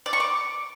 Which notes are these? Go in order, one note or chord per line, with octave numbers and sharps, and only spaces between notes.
D5
C#6
D6